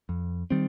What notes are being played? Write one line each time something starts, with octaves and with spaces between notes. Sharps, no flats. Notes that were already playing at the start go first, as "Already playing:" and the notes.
F2
D#3 G3 C4